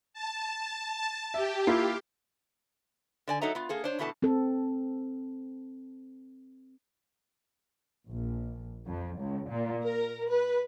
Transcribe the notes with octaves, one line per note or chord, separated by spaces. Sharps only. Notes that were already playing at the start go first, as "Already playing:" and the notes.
A5
G4 E5
A#3 E4 F4
D3 D5 G#5
F#3 D#4 A4 D#5 E5 A#5
B3 F4
A#3 G#4 A4
D4 C5 C#5
E2 B2 E3 A3 A5
C4 A4
A#1
F2
C#2
A#2
A#4
B4